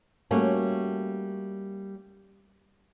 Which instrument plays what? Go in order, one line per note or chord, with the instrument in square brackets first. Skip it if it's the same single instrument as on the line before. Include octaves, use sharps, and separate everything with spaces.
[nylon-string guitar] G3 A3 A#3 C#4 F#4